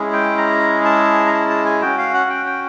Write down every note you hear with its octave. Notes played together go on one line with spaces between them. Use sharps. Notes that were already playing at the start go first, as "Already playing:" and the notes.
Already playing: G#3 C#4 E4 G#4
G5
A#5
A5
A#5
A5
A5
G#5
C#4 F#4 G5
F5
F#5
G5
G5